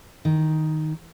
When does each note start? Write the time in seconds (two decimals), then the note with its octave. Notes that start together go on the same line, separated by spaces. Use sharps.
0.25 D#3